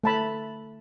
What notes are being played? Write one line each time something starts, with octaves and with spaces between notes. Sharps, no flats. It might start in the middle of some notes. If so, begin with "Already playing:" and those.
A3 A5 B5